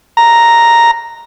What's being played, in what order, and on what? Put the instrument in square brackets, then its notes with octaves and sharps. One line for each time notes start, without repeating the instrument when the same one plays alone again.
[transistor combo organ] A#5